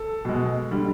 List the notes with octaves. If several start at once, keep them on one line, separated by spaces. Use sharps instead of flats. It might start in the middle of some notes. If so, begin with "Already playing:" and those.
Already playing: A4
B2 G#3
D3 G3